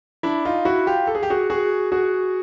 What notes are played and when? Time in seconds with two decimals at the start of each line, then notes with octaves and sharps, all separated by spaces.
0.23 D4 E4
0.45 D#4 F4
0.65 E4 F#4
0.87 F4 G4
1.07 A4
1.15 G#4
1.23 G4
1.30 F#4 G#4
1.50 F#4 G#4
1.92 F#4 G#4